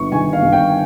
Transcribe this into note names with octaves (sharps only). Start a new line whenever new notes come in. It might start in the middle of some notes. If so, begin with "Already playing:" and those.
Already playing: G1 C#6
D#3 G#5
F5
G1
G5